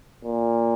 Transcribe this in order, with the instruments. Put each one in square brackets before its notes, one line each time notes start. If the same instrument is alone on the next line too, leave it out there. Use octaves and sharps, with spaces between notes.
[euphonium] A#2